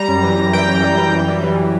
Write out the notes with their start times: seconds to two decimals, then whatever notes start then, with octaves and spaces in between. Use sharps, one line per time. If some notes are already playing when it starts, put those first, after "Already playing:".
Already playing: G3 A#5
0.08 F#2
0.24 E3
0.38 F#2
0.53 E3 G5
0.68 F#2
0.84 G3
0.98 E3
1.13 F#2
1.28 G3
1.43 E3